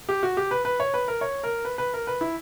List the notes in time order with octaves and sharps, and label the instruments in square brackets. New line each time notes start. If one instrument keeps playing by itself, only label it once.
[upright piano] G4
F#4
G4
B4
B4
C#5
B4
A#4
C#5
A#4
B4
B4
A#4
B4
E4